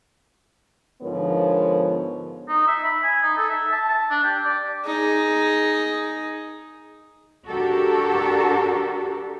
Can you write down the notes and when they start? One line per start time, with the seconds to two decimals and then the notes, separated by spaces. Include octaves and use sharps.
1.02 G#2 D3 F3 B3 A#4 C#5
2.49 D#4
2.68 E5
2.84 B5
3.03 G#5
3.23 D#4
3.37 A4
3.49 E5
3.72 A5
3.89 A5
4.10 D4
4.23 G4
4.45 D5
4.86 D#4 G#4
7.49 D4 F#4 G4 A4 A#4